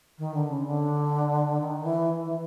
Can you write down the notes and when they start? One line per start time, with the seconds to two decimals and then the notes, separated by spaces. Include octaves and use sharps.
0.18 D#3
0.34 D3
0.50 C#3
0.66 D3
1.60 D#3
1.84 E3
2.24 E3